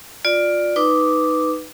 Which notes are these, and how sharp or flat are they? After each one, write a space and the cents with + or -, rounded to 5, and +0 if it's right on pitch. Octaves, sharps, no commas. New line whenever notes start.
F4 +15 D5 +10
D#4 +0 B4 +5 D6 -5